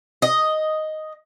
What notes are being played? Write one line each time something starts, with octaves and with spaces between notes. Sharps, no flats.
D#5